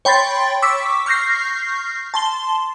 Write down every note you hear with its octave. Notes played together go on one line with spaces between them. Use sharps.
C#5 G5 B5 C6 A6
C#6 D6 E6 B6
C#6 F6 G6 A#6 C7
A5 C6 G7